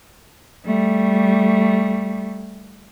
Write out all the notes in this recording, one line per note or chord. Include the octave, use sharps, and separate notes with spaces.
G3 A3